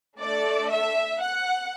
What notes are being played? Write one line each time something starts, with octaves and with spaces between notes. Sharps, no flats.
A3 D4 A4 D5
E5
F#5